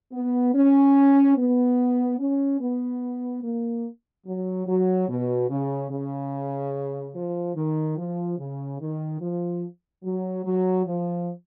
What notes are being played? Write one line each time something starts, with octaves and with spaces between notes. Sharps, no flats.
B3
C#4
B3
C#4
B3
A#3
F#3
F#3
B2
C#3
C#3
F3
D#3
F3
C#3
D#3
F3
F#3
F#3
F3